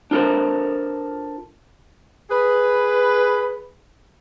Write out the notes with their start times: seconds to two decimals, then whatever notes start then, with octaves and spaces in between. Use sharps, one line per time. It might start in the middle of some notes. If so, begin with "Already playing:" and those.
0.11 D4 F4 A4 A#4 C5
2.30 G#4 B4